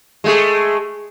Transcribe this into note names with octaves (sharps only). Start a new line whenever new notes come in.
G#3 A3 G#4